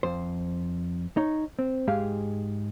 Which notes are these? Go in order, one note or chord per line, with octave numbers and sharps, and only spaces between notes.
F2 C5
D#4 C#5
C4
G#2 G#3 G4 G#4 F5